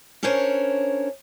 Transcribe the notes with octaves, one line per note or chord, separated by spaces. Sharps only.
C#4 D4 A#4 C5 C#5